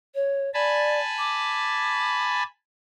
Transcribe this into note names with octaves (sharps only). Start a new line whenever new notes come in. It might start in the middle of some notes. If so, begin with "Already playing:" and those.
C#5
D5 G#5 A5 B5
D6